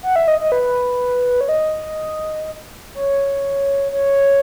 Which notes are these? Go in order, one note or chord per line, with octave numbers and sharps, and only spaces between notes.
F#5
E5
D#5
D#5
B4
C#5
D#5
C#5
C#5